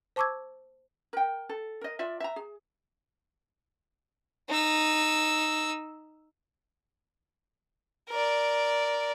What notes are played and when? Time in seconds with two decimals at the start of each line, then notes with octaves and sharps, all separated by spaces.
0.16 C5 A5 C#6 D6 E6 G#6
1.13 A#4 G5
1.49 A4
1.81 A#4 D#5
1.99 F4 D5 E5
2.20 E5 A#5
2.36 G#4
4.49 D#4 E6
8.09 A#4 D5